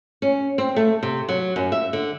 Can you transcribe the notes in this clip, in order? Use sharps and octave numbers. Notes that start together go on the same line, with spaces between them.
C#4
C4
A3
C3
F#3
F#2
E5
D3